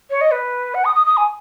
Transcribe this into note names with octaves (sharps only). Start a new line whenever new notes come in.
C#5
D#5
B4
F#5
D#6
D#6
D#6
G#5